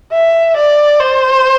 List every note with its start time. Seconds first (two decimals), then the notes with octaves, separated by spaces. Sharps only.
0.13 E5
0.57 D5
1.00 C5